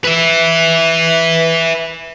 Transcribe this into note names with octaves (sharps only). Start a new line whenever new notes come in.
B4 E5